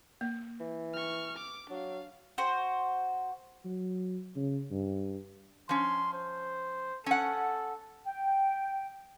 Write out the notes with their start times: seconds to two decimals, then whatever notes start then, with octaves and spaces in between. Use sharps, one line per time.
0.21 A#3
0.60 E3
0.94 C#6 F6
1.38 D6
1.70 F#3 D4 F5
2.38 F#4 C5
3.65 F#3
4.36 C#3
4.71 G2
5.69 F3 C#4 C6
6.13 C5
7.06 C#4 A4 F#5
8.07 G5